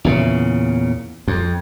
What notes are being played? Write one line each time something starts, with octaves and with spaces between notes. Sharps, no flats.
E2 A#2 C#3
F2